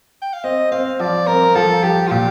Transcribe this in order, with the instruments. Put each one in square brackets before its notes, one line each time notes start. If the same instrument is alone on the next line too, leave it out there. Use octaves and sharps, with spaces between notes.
[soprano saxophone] G5
F5
[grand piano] C4 [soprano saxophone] D#5
[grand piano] C4 [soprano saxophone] F5
[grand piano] F3 [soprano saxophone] D5
[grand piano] C4 [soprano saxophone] A#4
[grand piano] F3 [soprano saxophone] A4
[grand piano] F3 [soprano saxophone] G4
[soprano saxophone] F4
[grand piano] A#2 [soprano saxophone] G4